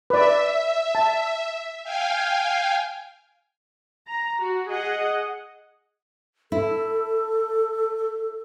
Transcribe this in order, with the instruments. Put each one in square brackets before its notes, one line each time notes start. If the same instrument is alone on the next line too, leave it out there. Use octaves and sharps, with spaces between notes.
[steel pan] B4 D5 [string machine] E5
[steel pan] A5
[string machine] F5 G5 G#5
[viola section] A#5
F#4
G#4 D#5 F#5
[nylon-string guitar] E4 [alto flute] A4